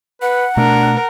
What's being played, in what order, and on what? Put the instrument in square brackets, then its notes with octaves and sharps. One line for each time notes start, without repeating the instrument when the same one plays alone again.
[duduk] B4 [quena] F#5
[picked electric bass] B2 A3 [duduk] D4 [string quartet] A#4